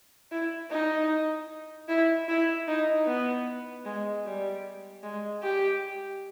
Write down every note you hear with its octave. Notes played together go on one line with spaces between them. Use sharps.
E4
D#4
E4
E4
D#4
B3
G#3
G3
G#3
G4